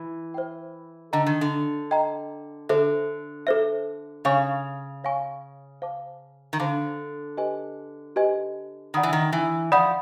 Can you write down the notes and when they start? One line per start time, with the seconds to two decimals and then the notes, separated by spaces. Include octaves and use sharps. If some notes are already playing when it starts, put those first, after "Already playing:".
Already playing: E3
0.34 C5 E5 G5
1.13 D3 D#5 G5 A#5
1.27 D#3
1.41 D3
1.91 D#5 G5 A#5
2.69 D3 A4 C5 E5
3.47 A4 C5 E5
4.25 C#3 C#5 F5 G#5 C#6
5.04 C#5 F5 G#5 C#6
5.82 C5 F5 A5 D6
6.53 D#3
6.60 D3 C5 F5 A5 D6
7.37 G4 B4 D#5 G#5
8.16 G4 B4 D#5 G#5
8.94 D#3 D5 F#5 B5 D#6
9.03 E3
9.13 D#3
9.33 E3
9.72 F3 D5 F#5 B5 D#6